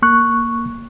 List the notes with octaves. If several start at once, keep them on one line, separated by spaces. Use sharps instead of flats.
A#3 C#6 F#6